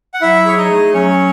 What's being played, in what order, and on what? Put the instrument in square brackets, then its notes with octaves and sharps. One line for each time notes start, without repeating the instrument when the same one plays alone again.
[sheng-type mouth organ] F#5
[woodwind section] F#3 [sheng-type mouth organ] E4 E5
[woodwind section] G#4 [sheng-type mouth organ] C#5
[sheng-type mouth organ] D#4 D#5
[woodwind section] A3
[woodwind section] F#3 [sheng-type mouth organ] C#4 C#5